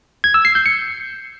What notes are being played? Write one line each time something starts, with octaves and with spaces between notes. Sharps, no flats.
G#6
E6
C7
G6
C#7